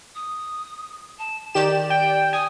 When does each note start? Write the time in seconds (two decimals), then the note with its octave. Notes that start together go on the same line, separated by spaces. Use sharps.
0.15 D#6
1.19 A5
1.54 D#3 G4 D5 E7
1.90 G5
2.33 G#5 D#6